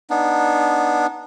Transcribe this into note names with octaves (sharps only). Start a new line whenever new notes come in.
B3 D4 D#4